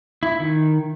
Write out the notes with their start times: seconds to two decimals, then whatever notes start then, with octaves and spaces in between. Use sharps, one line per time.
0.23 E4
0.40 D#3